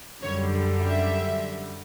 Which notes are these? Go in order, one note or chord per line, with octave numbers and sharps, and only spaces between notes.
F#2 D3 G3 C#5
E5